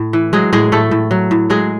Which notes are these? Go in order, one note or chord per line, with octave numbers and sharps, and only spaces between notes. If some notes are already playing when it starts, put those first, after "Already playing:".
Already playing: A2
E3
F#3 G#3 G#4
A2 G#3 G#4
A2 A3 A4
A2
F#3
A2
F#3 G#3 G#4